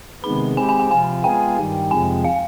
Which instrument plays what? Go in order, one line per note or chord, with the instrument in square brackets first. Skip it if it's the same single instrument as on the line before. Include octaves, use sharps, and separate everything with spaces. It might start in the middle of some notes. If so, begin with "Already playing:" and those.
[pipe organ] C3 D#3 G#3 B3 [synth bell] B5
[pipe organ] G#3 C4 G4 [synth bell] G#5
[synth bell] G#5
G#5
[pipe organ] C3 F3 C4 F4 [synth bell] G#5
[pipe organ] G#3 B3 F4 G#4 [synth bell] G5
[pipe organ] G2 D#3 G3
[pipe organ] F2 C3 F3 G#3 [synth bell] G#5
[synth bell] F5